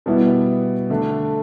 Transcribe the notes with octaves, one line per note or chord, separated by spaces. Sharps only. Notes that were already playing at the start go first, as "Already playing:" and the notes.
B2 G3 B3 E4
D3 A3 D4